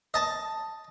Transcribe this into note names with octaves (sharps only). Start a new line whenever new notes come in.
D#5 A5